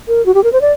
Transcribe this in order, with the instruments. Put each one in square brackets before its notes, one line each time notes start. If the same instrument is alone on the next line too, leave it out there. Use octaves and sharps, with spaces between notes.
[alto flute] A#4
F#4
G4
A#4
C5
D5